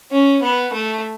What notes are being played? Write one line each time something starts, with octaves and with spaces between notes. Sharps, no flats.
C#4
B3
A3